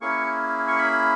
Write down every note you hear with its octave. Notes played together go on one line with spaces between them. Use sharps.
A#3 C#4 E4 G#4 C#6
C#6
B5